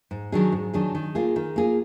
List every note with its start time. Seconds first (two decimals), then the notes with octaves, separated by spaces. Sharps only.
0.11 G#2
0.32 D#3 F#3 D4 G#4
0.52 G#2
0.73 D#3 F#3 D4 G#4
0.95 D#3
1.15 A#3 F4 G#4
1.36 D#3
1.56 A#3 F4 G#4